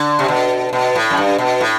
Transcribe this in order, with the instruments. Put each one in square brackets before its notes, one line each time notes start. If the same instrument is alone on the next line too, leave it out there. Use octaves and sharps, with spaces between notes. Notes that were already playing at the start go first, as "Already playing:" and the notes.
Already playing: [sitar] D3
C3
B2
B2
A2
F#2
G2
B2
A2